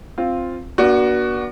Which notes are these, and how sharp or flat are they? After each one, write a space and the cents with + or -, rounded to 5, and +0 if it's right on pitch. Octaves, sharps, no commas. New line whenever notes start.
C4 +0 F4 +0
B3 -45 D4 +0 F#4 +10